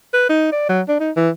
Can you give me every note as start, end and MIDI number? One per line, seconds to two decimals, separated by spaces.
0.13 0.27 71
0.29 0.49 63
0.52 0.68 74
0.69 0.82 54
0.88 0.97 62
1.00 1.11 63
1.16 1.30 52